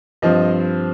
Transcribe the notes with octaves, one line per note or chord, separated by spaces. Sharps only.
G2 F3 C4 D#5